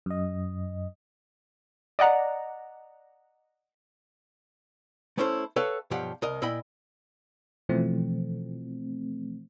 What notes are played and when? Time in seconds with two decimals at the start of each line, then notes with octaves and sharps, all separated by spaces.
0.06 F#2 D#5
1.99 D5 D#5 F#5 A#5
5.18 A3 B3 C#4 E4 A4 C5
5.56 A4 B4 C#5 E5 F5 G5
5.91 B1 G2 F3 G4 F5 F#5
6.22 C2 A#4 D#5
6.42 A#2 E4 D#5 G5 B5
7.69 B2 E3 F3 A3 C4